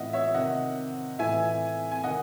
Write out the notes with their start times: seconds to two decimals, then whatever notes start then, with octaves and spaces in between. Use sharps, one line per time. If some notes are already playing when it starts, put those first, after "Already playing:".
Already playing: A2 E3 D#5 E5 F#5
0.13 C#5 E5
0.34 C3 D#3 D#5 F#5
1.19 A2 E3 E5 G#5
1.91 G#5
2.04 C3 D#3 D#5 F#5